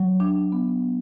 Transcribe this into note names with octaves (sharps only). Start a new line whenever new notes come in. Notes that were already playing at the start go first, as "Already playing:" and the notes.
Already playing: F#3
D4
B3